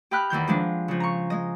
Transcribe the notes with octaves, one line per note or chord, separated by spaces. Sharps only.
G4 D#5 G5 B5 F6 F#6
E2 D#3 E3 G6
F3 G#3 D4
C#3 F3
A#5 C#6
G#3 D#5